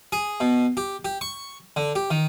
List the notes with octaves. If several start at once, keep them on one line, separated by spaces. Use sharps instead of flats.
G#4
B2
G4
G4
C#6
D3
G4
D#3